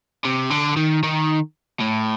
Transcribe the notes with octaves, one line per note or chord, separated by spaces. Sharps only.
C3
D3
D#3
D#3
A2